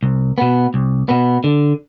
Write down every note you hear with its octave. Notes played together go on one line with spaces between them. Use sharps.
C2
B2 B3
C2
B2 B3
D3